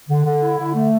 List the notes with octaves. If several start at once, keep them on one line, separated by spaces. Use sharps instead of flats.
D3
D3
E4
D3
A3